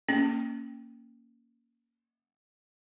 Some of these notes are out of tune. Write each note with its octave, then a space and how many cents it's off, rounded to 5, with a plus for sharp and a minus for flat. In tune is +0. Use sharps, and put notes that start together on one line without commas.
A#3 +0 C#4 +0